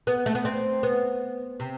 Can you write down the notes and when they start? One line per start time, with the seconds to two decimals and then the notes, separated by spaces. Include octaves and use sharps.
0.07 B3
0.26 A3
0.35 B3
0.45 C4
0.83 B3
1.60 C3